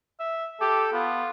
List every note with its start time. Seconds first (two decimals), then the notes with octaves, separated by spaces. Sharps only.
0.20 E5
0.61 G4 A4
0.93 B3 F4